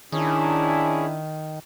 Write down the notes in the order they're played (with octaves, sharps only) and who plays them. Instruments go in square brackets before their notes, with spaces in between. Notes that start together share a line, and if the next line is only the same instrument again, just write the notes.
[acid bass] D#3 [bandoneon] C#4 G#4 [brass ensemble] D4 E4